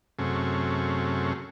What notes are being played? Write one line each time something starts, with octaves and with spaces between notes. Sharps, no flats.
F#2 C3 A3 C#4 G#4